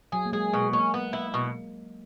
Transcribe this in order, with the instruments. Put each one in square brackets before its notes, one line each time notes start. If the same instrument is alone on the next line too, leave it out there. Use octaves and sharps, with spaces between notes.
[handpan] F#3 [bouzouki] G#4
[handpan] A#3
[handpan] G#3 [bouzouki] G#4
[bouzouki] B2 [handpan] G#3
[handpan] A#3 [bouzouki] C#4
[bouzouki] B3
E4
B2